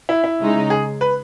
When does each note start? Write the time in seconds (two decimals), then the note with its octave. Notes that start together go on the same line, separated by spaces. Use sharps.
0.09 E4
0.24 E4
0.40 C#3 G#3 D#4
0.70 G#4
1.01 B4